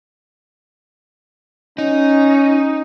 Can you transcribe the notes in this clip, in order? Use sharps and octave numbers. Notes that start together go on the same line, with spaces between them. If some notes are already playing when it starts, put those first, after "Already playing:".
C#4 D#4